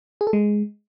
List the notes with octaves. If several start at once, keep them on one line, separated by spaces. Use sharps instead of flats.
G#4
A4
G#3